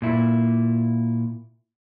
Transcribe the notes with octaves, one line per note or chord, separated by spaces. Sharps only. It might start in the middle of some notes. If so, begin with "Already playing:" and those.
A#2 E4